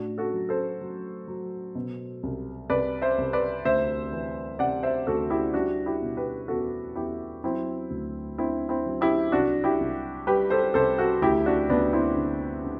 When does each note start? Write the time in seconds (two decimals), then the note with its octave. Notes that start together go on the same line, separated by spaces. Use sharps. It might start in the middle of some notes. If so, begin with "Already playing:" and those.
Already playing: A2 D4 F#4
0.18 F#4 A4
0.33 F#3
0.49 A4 C5
0.81 F#3
1.28 F#3
1.75 B2
2.23 C2
2.70 C2 B4 D5
3.02 C5 E5
3.18 C2
3.33 B4 D5
3.65 D2 C5 E5
4.12 E3
4.59 C3 D5 F#5
4.83 C5 E5
5.07 D2 F#4 A4
5.30 E4 G4
5.54 G3 D4 F#4
5.86 E4 G4
6.02 B2
6.17 G4 B4
6.48 E2 F#4 A4
6.95 E2 E4 G4
7.44 F#3 C4 E4
7.90 D2
8.38 D3 C4 E4
8.69 C4 E4
8.86 F#3
9.01 E4 G4
9.32 C2 D4 F#4
9.64 E4 G4
9.80 C2
10.27 G3 G4 B4
10.50 A4 C5
10.74 C2 A4 C5
10.98 F#4 A4
11.22 D2 E4 G4
11.46 D4 F#4
11.70 D2 B3 D4
11.93 C4 E4
12.16 D3
12.64 D3